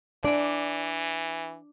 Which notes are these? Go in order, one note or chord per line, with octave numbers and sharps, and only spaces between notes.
E3 D4 D5